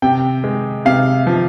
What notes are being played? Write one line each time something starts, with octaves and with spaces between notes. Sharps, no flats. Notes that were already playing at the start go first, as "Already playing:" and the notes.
C3 G5
G#3
C3 F5
F3